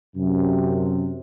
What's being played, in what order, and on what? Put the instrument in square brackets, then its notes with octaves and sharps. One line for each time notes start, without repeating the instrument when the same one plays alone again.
[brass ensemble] F#2 C3